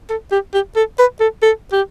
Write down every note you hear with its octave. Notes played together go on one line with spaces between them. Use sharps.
A4
G4
G4
A4
B4
A4
A4
G4